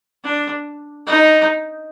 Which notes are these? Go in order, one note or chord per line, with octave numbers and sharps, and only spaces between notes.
D4
D#4